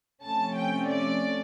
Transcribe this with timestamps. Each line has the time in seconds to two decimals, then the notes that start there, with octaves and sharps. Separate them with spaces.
0.24 C3 F3 A3 C#4 A5
0.57 G5
0.89 D5